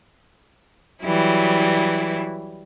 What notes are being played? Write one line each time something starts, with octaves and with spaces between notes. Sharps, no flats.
E3 F#3 G3 E4